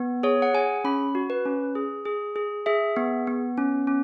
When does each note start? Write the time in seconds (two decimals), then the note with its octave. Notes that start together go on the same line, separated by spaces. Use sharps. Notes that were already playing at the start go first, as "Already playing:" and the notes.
Already playing: B3
0.23 G#4 C#5
0.42 F#5
0.54 G#4 G#5
0.84 C#4 B5
1.15 F#4
1.30 B4
1.45 C#4
1.75 G#4
2.05 G#4
2.36 G#4
2.66 G#4 E5
2.96 B3
3.27 B3
3.57 C#4
3.87 C#4